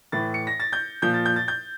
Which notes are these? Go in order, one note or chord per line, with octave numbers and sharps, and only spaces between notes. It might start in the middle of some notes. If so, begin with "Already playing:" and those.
A2 E3 A6
C#7
A#6
A6
G6
A#2 F3 G6
A6
G6
A6
G6